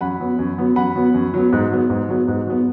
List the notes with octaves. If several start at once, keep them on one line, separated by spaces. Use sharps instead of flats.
F#2 F#5 B5
F#3 B3
F#2
F#3 B3
F#2 F#5 B5
F#3 B3
F#2
F#3 B3
G#2
F#3 B3
G#2
F#3 B3
G#2
F#3 B3